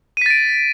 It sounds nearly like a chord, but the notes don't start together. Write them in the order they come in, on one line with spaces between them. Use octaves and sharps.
D#7 B6 A6 D7